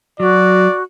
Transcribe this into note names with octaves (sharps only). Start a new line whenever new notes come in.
F#3 F#4 D5